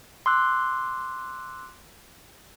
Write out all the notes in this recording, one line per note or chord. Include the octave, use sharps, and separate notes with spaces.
C6 D6 E6 F#6